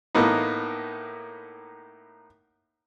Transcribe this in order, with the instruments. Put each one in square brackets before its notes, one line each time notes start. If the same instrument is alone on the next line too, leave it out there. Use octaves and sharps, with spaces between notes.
[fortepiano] A2 A#3 B3 D#4